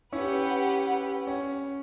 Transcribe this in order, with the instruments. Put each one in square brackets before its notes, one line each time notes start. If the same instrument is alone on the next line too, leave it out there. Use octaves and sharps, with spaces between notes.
[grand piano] C#4 E4 [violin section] G4 B4 F#5
[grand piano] C#4